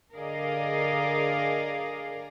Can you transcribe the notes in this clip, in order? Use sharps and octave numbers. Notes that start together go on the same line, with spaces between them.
D3 G#4 A#4 D5 D#5 F5